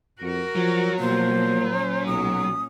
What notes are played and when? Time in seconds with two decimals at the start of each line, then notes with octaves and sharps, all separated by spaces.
0.21 F2 F#4 A#4
0.56 F3 F#3
1.00 B2 F3 A#3 C5
1.67 A#2 C#4
2.07 B1 D#6